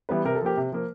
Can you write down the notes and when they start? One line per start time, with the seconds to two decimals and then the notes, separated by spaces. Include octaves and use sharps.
0.09 E3 G3 B3 B4
0.25 C3 A#4
0.35 A4
0.41 F3 A#3 G4
0.57 C3
0.72 F3 A#3